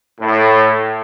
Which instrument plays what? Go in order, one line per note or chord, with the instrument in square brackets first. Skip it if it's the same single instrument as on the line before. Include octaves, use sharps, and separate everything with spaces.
[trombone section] A2